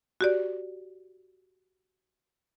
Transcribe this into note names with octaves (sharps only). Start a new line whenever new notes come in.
F#4 G4 D5